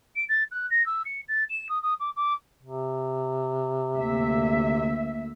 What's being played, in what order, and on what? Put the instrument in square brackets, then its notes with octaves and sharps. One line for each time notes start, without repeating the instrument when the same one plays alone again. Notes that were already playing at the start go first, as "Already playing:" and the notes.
[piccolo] D7
A6
F#6
A#6
E6
C#7
A6
E7
D#6
D#6
D6
D6
[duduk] C3
[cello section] D2 A#3 E5